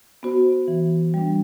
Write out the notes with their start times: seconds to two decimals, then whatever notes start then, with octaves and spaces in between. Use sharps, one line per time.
0.23 B3 F#4 C5
0.68 E3
1.14 G3 D4